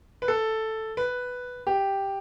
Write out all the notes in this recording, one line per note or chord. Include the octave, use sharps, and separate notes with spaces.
B4
A4
B4
G4